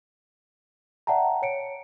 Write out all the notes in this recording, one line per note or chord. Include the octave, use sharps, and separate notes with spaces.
D5 E5 F#5 G5 A5 A#5
C#5 C#7 D7